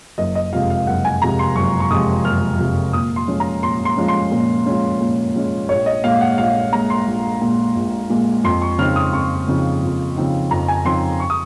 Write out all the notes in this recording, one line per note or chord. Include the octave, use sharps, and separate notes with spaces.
F#1 D#5
D#5
F2 C3 F3 G#3 F5
F5
F#1 F#5
G#5
F2 C3 F3 G#3 A#5
C6
F#1 C#6
C#6
F2 C3 F3 G#3 D#6
F#1 F6
F2 C3 F3 G#3
A#2 D#6
C6
F3 G#3 C#4
A#5
A#2 C6
C6
F3 G#3 C#4
C6
A#2
F3 G#3 C#4
A#2
F3 G#3 C#4
A#1 C#5
D#5
A#2 G#3 F5
F#5
A#1 F5
A#2 G#3 A#5
C6
A#1
A#2 G#3
A#1
A#2 G#3
F2 C6
C#6
C#3 F3 C4 D#4 F6
D#6
F2 C#6
C#3 F3 C4 D#4
F2
C#3 F3 C4 D#4
F2 A#5
G#5
C#3 F3 C4 D#4 C6
C#6
D#6